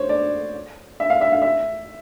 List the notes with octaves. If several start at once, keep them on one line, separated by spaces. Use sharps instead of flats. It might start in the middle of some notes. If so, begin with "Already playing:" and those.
Already playing: C5 C#5
D5
E5
F5
E5
F5
E5